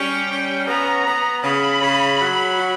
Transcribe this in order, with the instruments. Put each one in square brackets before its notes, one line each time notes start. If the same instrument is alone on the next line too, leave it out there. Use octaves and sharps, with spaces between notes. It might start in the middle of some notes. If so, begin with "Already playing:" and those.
Already playing: [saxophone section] G3 C#4 [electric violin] G5
[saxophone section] C#4
[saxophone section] B3 [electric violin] A#5
[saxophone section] B3
[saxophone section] C#3 [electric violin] B5
[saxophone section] C#3
F#3
F#4